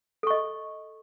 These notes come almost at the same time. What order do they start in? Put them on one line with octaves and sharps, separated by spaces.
A4 C#6 D#5